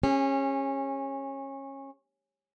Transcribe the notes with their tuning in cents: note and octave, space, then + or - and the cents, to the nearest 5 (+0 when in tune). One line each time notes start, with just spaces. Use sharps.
C#4 -20 G#4 -35